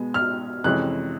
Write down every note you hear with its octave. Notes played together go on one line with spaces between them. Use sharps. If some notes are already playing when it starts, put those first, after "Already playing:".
Already playing: B2 G#3 B3
F6
F2 C3 E3 G#3 C#4 F#6